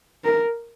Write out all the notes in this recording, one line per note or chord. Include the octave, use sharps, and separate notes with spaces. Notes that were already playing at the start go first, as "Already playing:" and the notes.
A#4